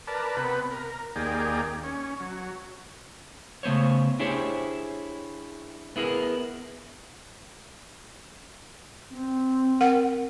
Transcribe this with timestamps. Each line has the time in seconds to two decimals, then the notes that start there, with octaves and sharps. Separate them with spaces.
0.07 A#4 B4 D5 A5
0.37 C3 B3 B4
0.71 A#4
1.16 D#2 A#3 G4 G#4 D5
1.83 C#4
2.20 F#3
3.63 C#3 A3 B3 C5 C#5
4.19 D4 E4 G4 G#4 C5 C#5
5.96 B3 E4 G#4 A#4
9.11 C4
9.81 A#4 F#5 G5